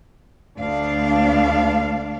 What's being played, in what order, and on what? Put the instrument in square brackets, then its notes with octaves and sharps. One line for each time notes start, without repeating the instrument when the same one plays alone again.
[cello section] D2 D4 F5